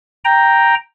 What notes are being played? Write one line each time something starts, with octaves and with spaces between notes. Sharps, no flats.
G5 A#5